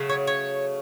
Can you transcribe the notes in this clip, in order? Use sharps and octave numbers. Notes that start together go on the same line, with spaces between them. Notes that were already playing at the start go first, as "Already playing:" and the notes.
Already playing: C#3 F#3 A3
C#5
C#5